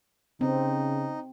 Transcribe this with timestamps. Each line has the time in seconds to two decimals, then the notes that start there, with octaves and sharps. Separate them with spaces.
0.41 C#3 C4 D#4